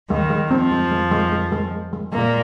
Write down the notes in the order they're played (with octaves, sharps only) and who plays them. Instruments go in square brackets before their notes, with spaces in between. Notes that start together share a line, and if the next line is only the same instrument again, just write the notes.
[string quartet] D#2 D#3 [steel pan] G#3
[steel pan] G#3
[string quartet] F2 F3 [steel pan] C4
[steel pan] G#3
G#3
G#3
G#3
G#3
G#3
G#3
[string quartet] A#2 A#3 [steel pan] G#3